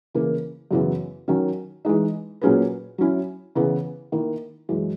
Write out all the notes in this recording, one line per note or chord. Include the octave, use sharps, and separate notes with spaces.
C#3 E3 A#3 E4
F#2 C#3 E3 B3
D#3 F#3 C#4
E3 G#3 D#4
A#2 F#3 C#4 G#4 B4
F#3 C#4 E4
C#3 E3 B3
D#3 A#3 E4
F#2 E3 G#3